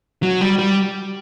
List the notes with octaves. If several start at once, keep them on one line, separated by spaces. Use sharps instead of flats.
F#3
G3
G3